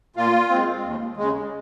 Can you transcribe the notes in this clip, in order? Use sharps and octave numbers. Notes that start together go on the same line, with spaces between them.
A#2 F4
G#3 C4
D#2
C#3 G#3